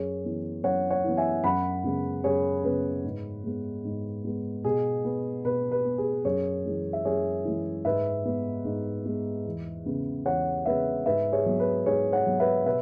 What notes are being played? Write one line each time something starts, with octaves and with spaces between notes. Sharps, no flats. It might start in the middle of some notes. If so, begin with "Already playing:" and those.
Already playing: F#2 G#4 C#5
E3 B3
F#2 C#5 F#5
C#5 F#5
E3 B3
E5 G#5
F#2 F#5 B5
C#3 G#3 B3
F#2 G#4 C#5
C#3 G#3 B3 B4
G#2
G#3 B3
G#2
G#3 B3
B2 G#4
B3
B2 B4
B4
B3
G#4
F#2 G#4 C#5
E3 G#3
E5
F#2 G#4 C#5
E3 G#3
G#2 B4 E5
G#3 B3
G#2
G#3 B3
E2
C#3 G#3 B3
E2 C#5 F#5
C#3 G#3 B3 B4 E5
G#2 B4 E5
G#4 C#5
F#3 B3
B4
G#2 G#4 C#5
C#5 F#5
F#3 B3
B4 E5
B2 B4 E5